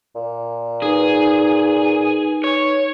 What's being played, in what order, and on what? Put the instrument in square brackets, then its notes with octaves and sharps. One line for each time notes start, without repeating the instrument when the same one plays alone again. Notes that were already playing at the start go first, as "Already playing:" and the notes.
[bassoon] A#2
[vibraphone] D#4 B4 [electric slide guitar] G#4
[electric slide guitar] C#5